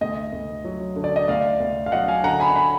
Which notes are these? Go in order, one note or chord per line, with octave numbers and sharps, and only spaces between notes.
D2 D#5
D2
F#3
D3
D5
D#5
D2 D5 F5
D2
F5
F#3 D#5 F#5
F5 G#5
D3 F#5 A#5
G#5 B5
G#5 B5